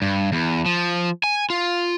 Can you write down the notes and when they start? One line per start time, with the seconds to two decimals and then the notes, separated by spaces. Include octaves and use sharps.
0.02 G2
0.32 E2
0.66 F3
1.24 G#5
1.50 F4